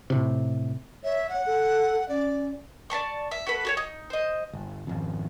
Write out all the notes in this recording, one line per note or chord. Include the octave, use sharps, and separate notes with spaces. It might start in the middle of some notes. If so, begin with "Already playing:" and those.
A2 C3
C#5 E5
F#5
A4
C#4 D5
D5 E5 A5 C#6
E5
F#4 A4 B4 B5
F#4 G#4 C#5
D#4
C5 D#5
G1
G#1 F2